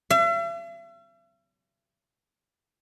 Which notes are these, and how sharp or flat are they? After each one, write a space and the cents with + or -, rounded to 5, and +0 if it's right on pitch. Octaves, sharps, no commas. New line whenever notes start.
E5 +45